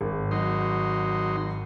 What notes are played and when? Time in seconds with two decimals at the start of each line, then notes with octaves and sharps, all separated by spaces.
0.01 G#1
0.31 F#3 D#4 C6